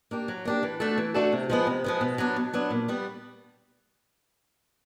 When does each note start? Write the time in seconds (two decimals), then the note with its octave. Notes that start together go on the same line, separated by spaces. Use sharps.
0.11 A#3 D4 G4
0.28 F#3
0.45 A#3 D4 G4
0.63 E3
0.80 A3 D4 F#4 A4
0.98 E3
1.14 A3 D4 F#4 A4
1.32 C3
1.50 F3 G#3 B3
1.67 C3
1.84 F3 G#3 B3
2.01 B2
2.18 F#3 B3 D4
2.36 B2
2.54 F#3 B3 D4
2.71 A#2
2.88 G3 B3